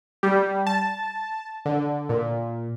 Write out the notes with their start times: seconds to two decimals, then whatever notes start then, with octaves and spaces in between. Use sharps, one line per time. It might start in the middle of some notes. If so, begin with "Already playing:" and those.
0.23 G3
0.67 A5
1.65 D3
2.09 A#2